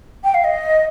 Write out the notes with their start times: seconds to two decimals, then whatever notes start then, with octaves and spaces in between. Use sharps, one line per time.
0.23 G5
0.34 F5
0.44 D#5